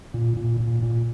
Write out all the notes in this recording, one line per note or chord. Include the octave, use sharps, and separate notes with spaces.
A#2
A#2
A#2
A#2